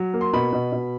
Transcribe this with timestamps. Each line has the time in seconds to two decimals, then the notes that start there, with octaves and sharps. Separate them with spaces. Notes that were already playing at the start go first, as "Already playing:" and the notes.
Already playing: F#3
0.14 A#3
0.21 C6
0.33 B2 B5
0.53 B2
0.72 B2